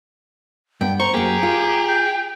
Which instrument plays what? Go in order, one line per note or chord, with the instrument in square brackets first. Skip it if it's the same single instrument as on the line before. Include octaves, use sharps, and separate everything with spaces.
[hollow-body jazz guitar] G2 B3 [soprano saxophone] G5
[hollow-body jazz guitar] C5 [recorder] A#5 [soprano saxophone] C#6
[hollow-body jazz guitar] F#2 A#3 [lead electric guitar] G4 [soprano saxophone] G#4
[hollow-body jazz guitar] F4
[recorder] G6